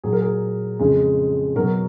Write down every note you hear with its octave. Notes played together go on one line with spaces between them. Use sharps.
A#2 F#3 G#4
A#4
G#4
F2 C#3 G#3
B2 F#3 A#4